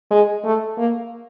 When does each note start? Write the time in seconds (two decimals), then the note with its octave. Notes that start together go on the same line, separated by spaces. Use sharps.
0.11 G#3
0.45 A3
0.78 A#3